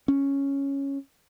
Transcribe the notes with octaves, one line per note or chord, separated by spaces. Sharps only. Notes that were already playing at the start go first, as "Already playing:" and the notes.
C#4